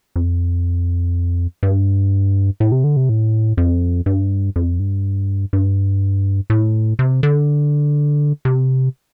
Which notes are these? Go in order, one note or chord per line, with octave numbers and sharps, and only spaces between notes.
F2
G2
A2
C3
D3
C3
A2
F2
G2
F2
G2
G2
A2
C3
D3
C3